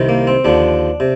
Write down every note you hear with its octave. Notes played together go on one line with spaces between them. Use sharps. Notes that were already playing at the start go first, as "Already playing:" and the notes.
Already playing: C2 C3 D#3
A#3
C4
D#2 D3 F3 D4
C3